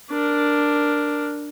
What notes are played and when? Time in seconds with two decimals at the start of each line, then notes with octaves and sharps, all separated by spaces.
0.11 D4 A#4